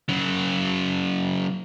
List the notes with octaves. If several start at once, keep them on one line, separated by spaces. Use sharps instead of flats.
C#3 F#3